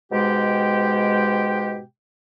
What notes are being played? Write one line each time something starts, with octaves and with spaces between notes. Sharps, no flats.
G#2 B2 G#3 G4 G5